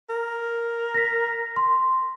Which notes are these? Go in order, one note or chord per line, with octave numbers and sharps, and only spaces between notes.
A#4
A#6 B6
C6